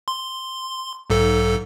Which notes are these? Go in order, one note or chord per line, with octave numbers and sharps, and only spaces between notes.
C6
B1 G#2 A4